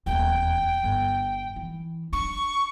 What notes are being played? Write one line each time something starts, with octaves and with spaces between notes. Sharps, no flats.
D#1 E2 G5
G1
E3
D4 C#6